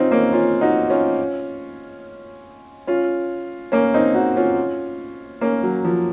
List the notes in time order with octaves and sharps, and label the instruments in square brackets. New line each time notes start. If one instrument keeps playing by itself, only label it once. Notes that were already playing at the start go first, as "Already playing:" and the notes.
Already playing: [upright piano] C4 C#4 D#4 F4
A#3 C#4
C#4 F4
D#4 F#4
C#4 F4
C#4 F4
A#3 C#4
C4 D#4
D#4 F#4
C#4 F4
A#3 C#4
F#3
F3